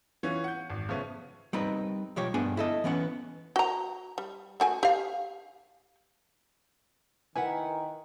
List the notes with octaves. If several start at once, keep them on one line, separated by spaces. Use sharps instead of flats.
E3 B3 C#4 F4
F#5 G6
G#1
C#3 F3 A3 B3 C#4
G3 C4 D#4 A#4 B4
B1 F3 G4 C#5
G2 B3 D4 G#4 G#5
E4 A4 D#5
E3 B3 C#4 F#5
F#4 A#5
G3
A3 F#4 G#5
G4 F5
D#3 E4 A#4 B4 F#5 G#5